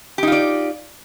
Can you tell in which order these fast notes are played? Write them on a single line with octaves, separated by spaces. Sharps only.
G4 D#4 F4 D5